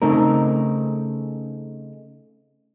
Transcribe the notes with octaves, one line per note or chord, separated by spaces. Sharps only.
C#3 A3 C4 D#4 A#4